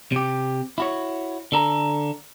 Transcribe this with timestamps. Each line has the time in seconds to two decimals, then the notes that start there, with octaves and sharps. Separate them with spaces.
0.12 C3 G4
0.78 E4 F#4 C#5
1.52 D3 A4 A#5